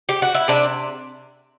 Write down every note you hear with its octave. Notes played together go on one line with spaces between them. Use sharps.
G4
F#4
E4
C3 D4